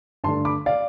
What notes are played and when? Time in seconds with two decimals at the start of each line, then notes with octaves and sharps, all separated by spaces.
0.24 G2 D3 A3 D4 A5 C6
0.45 B5 D6
0.66 D5 F5